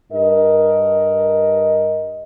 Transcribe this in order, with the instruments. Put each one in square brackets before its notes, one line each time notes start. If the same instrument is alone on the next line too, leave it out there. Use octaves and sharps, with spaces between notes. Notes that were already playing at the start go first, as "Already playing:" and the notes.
[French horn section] G2 A#4 D#5